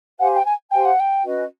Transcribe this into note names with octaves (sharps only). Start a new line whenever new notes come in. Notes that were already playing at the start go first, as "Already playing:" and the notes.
G4 C5 F5 F#5 G#5
G5
G#5
G4 C5 F5 G5 G#5
F#5
G5
C#4 F#4 B4 D#5